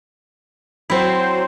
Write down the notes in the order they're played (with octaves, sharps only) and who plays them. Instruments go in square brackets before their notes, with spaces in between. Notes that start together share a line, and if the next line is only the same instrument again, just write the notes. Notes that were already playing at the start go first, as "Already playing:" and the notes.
[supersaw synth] F#3 C5 [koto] C4 E4